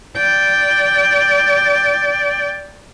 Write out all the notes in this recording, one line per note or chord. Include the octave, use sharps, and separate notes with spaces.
D5 G5